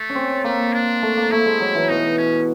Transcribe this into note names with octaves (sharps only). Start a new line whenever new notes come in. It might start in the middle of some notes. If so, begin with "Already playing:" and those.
Already playing: A3
C#4
C4
A3 A#3
D4
A3
A#3
A3 E4
G#3
F#3
E3
B2 D#4
C#4